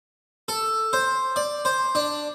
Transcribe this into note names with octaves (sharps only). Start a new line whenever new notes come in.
A4
C5
D5
C5
D4